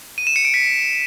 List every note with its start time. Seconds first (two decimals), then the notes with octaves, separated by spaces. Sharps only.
0.18 D#7
0.27 E7
0.36 C#7
0.45 D7
0.54 B6